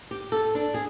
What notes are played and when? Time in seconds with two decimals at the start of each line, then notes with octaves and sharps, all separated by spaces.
0.11 G4
0.32 A4
0.55 D4
0.74 G#4